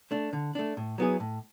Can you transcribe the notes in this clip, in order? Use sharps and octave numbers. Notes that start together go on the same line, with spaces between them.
A3 D4
D3
A3 D4
A2
F#3 B3 E4 G#4
A2